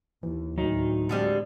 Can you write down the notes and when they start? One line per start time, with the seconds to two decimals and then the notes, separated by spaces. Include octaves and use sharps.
0.23 D#2 E3
0.58 D2 A2 D#3 F#3 D#4
1.09 D3 G3 G#3 C4 G#4 A4